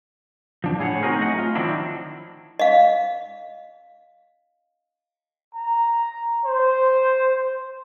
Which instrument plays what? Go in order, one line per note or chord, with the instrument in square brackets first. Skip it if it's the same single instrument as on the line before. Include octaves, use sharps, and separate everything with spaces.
[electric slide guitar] F3 D4
A2 G#4 C#5 F#5
C4 D#4 F#4 G#4 A#4 C5
F#3 A3 G#4 D#5 F#5
F4
D#3 F3 F#3 C4 D4 E4
[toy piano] D#5 F5
[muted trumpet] A#5
C5